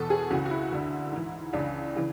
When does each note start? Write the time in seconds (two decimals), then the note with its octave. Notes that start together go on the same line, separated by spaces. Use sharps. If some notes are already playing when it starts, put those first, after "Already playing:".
Already playing: E2 B2 A4
0.10 G#4
0.30 C#2 C#3 E3 F#4
0.45 F#4
0.50 E4
0.72 D2 D3
1.11 G#2 E3
1.53 C#2 C#3 E3 D4
1.96 C#3 E3